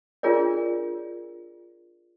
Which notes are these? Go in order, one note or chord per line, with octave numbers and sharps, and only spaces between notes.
D4 F4 G#4 A#4 C#5 D5